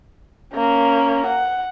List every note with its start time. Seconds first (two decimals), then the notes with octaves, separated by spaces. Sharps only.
0.55 A#3 C#4
1.26 F#5